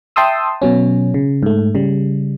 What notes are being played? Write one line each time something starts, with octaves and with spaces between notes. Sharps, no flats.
E5 G5 A5 C6 D#6 E6
B2 F#3 C#4
C#3
G#2 A3
C#3 G3